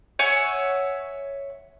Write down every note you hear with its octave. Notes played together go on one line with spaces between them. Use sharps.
C#5 E5 F#5 G#5